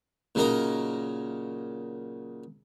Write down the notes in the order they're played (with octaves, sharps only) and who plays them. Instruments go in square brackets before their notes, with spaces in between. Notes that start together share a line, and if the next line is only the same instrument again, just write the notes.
[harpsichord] A#2 C#3 F#3 D#4 A#4 D#5